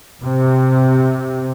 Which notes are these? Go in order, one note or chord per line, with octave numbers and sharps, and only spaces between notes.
C3